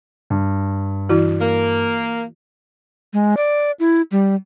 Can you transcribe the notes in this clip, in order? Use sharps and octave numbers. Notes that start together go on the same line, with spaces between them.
G2
E3 E4 F#4
A#3
G#3
D5
E4
G3